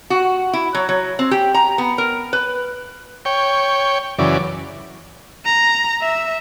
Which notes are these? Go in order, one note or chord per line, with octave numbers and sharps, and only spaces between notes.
F#4
E4
F#3
F#3
C4
G4
A#5
B3
A#4
B4
C#5 G5
F#2 C#3 E3 D5
A#5
E5